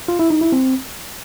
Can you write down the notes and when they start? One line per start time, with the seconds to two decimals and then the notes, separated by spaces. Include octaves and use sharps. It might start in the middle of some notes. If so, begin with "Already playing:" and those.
0.08 F4
0.19 E4
0.30 D#4
0.41 E4
0.52 C4